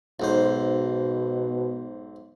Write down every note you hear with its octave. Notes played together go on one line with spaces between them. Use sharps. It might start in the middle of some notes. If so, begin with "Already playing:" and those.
B1 G#2 B2 C5